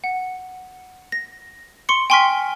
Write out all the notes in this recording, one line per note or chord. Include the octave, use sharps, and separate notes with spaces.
F#5
A#6
C6 C#6 C#7
G5 G#5 C6 C#6 F6 B6